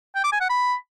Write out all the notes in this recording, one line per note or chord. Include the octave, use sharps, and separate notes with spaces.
G5
D6
G#5
F#5
B5